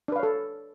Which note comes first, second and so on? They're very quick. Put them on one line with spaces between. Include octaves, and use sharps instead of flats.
D4 B4 F5 C#5 A4